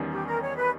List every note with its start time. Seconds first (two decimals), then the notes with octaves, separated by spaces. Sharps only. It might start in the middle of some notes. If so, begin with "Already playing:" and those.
Already playing: E2 D#3 G3 C#4
0.10 G4
0.26 A#4
0.41 C#5
0.56 B4